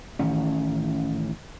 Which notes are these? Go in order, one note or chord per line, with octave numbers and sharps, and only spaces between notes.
A1 D#3 C#4